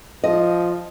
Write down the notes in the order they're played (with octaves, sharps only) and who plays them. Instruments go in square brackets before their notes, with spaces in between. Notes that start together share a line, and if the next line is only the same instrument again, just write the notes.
[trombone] F3 [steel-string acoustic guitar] D#5